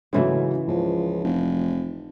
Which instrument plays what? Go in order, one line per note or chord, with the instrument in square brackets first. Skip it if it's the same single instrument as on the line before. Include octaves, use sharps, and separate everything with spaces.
[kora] G#2 E3 A3 [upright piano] C#3 F#3 C#4
[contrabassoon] C#2 [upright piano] F3
[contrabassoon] F1